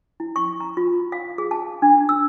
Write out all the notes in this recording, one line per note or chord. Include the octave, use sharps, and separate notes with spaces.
E4
C#6
A#5
F4
F5
G#4
A5
D4
E6